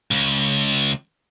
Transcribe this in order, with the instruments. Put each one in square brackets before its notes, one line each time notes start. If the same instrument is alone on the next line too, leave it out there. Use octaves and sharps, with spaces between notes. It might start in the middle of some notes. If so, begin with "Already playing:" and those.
[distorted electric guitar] C#2